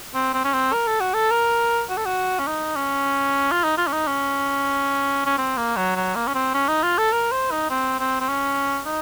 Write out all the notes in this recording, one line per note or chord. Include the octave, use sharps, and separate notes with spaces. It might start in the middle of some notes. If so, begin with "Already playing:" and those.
C4
C4
C#4
C4
A#4
A4
F#4
A4
A#4
F#4
A4
F#4
C#4
D#4
C#4
F4
D#4
F4
C#4
D#4
C#4
C#4
C4
A#3
F#3
F#3
A#3
C#4
C4
C#4
D#4
F4
A4
A#4
C5
D#4
C4
C4
C4
C#4
D#4